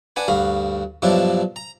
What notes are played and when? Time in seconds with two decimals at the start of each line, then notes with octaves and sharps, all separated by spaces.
0.16 D4 B4 F#5 G#5 B5
0.28 D2 G2 F#4 F5 B5
1.02 G2 B2 F3 F#3 D4 E4
1.56 A#5